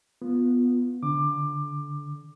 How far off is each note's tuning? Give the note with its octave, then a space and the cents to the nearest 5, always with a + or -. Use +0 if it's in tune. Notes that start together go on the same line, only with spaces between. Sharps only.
B3 +0 F4 +5
D3 -20 D6 +20